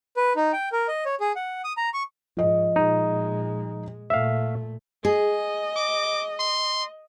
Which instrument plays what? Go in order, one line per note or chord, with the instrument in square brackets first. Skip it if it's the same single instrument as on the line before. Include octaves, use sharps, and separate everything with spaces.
[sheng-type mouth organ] B4
D#4
G5
A#4
D#5
C#5
G#4
F#5
D#6
A#5
C#6
[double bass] G#2 [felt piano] F3 D#5
[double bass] A#2 G#3 [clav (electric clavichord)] D#4
[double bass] A#2 A3 [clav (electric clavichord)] E5 F5
[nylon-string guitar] G#4 [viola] D#5
[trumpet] D6
C6